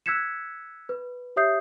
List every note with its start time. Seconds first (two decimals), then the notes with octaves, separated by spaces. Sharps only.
0.06 E6 F#6 G#6 B6 C#7 E7
0.89 B4
1.36 G4 C#5 E5 D#6 G6 C7